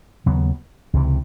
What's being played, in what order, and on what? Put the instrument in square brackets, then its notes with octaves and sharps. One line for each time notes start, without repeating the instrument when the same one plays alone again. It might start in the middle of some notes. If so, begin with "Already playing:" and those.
[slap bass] D#2 C#3 F#3 B3
C#2 C3 E3